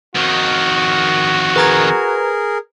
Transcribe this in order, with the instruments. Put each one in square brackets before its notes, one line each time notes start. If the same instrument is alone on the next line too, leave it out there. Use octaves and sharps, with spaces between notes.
[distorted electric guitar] F2 D#3 [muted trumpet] F#4
[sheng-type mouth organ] G#4 A#4 [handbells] B4 A#5 G#6